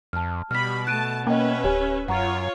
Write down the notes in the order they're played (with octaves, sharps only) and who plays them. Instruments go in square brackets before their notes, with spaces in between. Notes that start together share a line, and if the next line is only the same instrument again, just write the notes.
[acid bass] F2 [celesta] A5 F6
[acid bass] B2 [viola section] G3 B5 [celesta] F6 B6
[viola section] A3 A5 [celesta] F#6 D7 D#7
[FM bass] A#3 [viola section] C#4 B4 E5 [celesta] D#5 G5
[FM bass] D1 [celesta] G4 C#5 G#5
[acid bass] F#2 [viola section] F4 C#5 [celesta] F#5 A#5 C#6